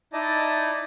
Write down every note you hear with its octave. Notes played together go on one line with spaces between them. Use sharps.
D#4 E4 D5 D#5 A5